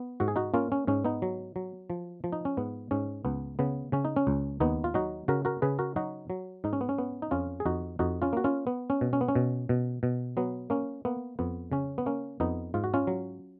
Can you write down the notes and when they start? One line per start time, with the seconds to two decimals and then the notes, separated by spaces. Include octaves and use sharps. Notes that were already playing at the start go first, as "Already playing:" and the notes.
Already playing: B3
0.20 G#2 F#4
0.28 G#4
0.36 D#4 F#4
0.54 A#3 C#4 F4
0.72 C#4
0.87 G#2 C#4
1.05 B3 D#4
1.22 F#3
1.56 F#3
1.90 F3
2.24 F3
2.33 D#4
2.45 C#4
2.57 G#2 B3
2.91 G#2 C#4
3.25 C#2 B3
3.59 C#3 B3
3.92 C#3 C#4
4.05 D#4
4.16 C#4
4.27 C#2
4.60 D#2 B3 D#4
4.84 F4
4.94 F#3 D#4 F#4
5.28 C#3 F#4 A#4
5.45 F#4 A#4
5.62 C#3 G#4 B4
5.79 F#4 A#4
5.96 F#3 D#4 F#4
6.30 F#3
6.64 G#2 D#4
6.73 C#4
6.81 B3
6.89 C#4
6.98 B3
7.22 D#4
7.31 F2 C#4 F4
7.60 G#4
7.65 F2 D#4 F#4
7.99 F2 D#4 F#4
8.22 C#4 F4
8.33 A#3 F#4
8.44 C#4 F4
8.67 B3
8.90 C#4
9.01 B2
9.13 C#4
9.21 B3
9.28 C#4
9.35 B2
9.69 B2
10.03 B2
10.37 F#3 B3
10.70 A#3 C#4
11.05 A#3 B3
11.39 F2 B3
11.72 C#3 C#4
11.98 B3
12.06 A#3 C#4
12.40 F2 B3 D#4
12.74 G#2 F4
12.84 F#4
12.94 C#4 F4
13.07 F#3